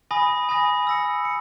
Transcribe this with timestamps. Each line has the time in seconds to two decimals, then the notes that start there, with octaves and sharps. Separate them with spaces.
0.11 G#5 B5 D#6 A#6
0.49 G#5 B5 D#6 A#6
0.87 E6 A#6 C#7
1.25 C#7